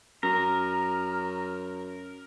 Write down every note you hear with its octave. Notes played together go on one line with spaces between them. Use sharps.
F#2 A#4